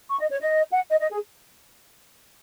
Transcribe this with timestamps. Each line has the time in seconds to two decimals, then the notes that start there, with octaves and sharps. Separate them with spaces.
0.10 C#6
0.19 D#5
0.30 C#5
0.39 D#5
0.70 F#5
0.89 D#5
0.99 D#5
1.10 G#4